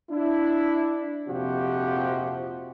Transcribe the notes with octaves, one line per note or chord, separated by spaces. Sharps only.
D4 E4
A#1 F2 C3 F3 F#4 G4